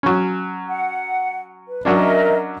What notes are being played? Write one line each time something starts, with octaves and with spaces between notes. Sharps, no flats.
F#3 C#4
F#5
B4
F#3 C#4 D4 A#4 D#5 E5